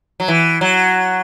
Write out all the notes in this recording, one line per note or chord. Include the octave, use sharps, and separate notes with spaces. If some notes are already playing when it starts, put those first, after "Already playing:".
F#3
E3
F#3